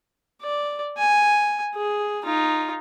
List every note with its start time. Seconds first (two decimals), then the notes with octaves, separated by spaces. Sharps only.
0.42 D5
0.98 G#5
1.76 G#4
2.24 D#4 F4